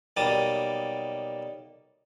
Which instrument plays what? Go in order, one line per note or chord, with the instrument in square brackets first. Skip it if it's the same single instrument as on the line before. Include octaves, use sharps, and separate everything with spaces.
[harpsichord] B1 B2 G3 A#3 A5 D#6